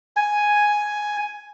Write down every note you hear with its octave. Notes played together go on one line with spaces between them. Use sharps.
G#5